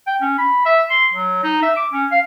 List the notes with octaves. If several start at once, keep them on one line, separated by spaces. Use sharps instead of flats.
G5
C#4
B5
E5
C6
F#3
D#4
E5
D6
C#4
F5